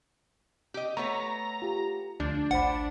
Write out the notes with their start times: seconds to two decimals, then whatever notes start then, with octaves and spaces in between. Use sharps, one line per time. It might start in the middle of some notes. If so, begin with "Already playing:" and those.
0.74 G4 D#5
0.97 A3 B3 C#5 A#5
1.62 F4 G4
2.20 D2 F3 A3 D4
2.51 A1 C5 F#5 B5